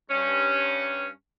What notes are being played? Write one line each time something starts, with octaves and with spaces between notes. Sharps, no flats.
G2 C#4